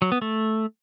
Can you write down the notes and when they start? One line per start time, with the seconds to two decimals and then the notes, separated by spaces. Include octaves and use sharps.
0.02 F#3
0.12 B3
0.22 A3